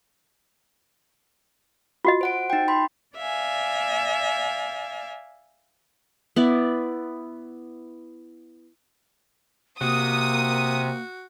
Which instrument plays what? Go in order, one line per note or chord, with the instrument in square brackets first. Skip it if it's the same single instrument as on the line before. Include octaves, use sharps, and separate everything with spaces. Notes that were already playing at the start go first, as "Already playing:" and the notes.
[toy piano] F4 F#4 D#5
[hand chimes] C5 F#5 D7
D#4 G5
B5 C6
[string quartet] D5 E5 F5 G#5
[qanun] B3 E4 D5
[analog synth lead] C3 [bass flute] A#3 [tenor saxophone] F#4 [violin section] D#6